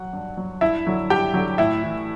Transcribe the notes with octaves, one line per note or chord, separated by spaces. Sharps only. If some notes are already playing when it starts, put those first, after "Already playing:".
Already playing: F#3 F#5
G2
F#3
G2 E4 E5
D3 F#3
G2 G4 G5
D3 F#3
A2 E4 E5
E3